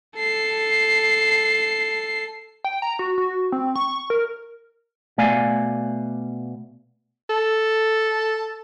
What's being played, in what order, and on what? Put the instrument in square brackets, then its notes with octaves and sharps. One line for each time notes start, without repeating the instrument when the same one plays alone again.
[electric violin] A4 C7
[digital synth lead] G5
A#5
F#4
F#4
C4
C#6
A#4
[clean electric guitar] B2 A3 D5 F5 G#5
[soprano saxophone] A4